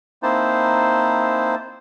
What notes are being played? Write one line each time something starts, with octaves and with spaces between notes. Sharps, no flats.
A#3 C4 D#4 E4 C5 A5